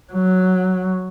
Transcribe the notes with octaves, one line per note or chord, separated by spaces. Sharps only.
F#3